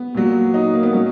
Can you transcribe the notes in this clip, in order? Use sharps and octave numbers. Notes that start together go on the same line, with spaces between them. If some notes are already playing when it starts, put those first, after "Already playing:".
Already playing: B3
A#2 F#3
D#4
A#3
B3
F#3 C#4